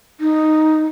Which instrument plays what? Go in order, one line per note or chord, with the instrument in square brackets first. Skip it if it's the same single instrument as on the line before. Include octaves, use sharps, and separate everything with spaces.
[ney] D#4